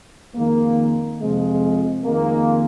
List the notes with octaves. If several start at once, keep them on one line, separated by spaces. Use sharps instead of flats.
F2 D#3 G#3 A#3
F2 C3 F3 G#3
F2 D#3 G#3 A#3